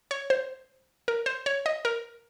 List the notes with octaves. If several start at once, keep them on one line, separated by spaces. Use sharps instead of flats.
C#5
C5
A#4
C5
C#5
D#5
A#4